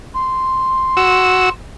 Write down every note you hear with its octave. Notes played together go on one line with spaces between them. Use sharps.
C6
F#4 E6